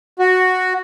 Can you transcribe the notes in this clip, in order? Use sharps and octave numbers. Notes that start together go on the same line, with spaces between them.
F#4